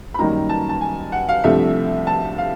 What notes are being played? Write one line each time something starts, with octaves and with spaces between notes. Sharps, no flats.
B5
F#2 D#3 G3 A#3 D#4 A#5
A5
A5
G#5
F#5
F5
C2 C3 F3 A3 D4 E5
A5
F5